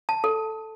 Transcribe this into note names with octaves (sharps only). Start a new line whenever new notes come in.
A5
A4